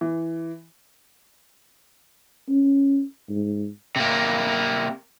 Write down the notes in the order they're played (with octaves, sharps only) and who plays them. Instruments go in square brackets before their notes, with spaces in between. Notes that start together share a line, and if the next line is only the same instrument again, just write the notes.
[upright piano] E3
[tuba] C#4
G#2
[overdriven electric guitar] C3 A#3